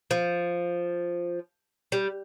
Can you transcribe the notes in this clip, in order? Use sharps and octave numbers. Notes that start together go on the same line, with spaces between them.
F3
G3